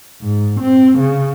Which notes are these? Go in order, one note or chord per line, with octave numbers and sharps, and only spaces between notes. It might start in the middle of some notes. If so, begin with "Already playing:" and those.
G#2
C4
C#3